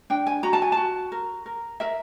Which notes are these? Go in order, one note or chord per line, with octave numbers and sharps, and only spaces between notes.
D4 G5
G#5
F#4 A#5
A5
G#5
A5
F#4
A#4
A#4
A#4 E5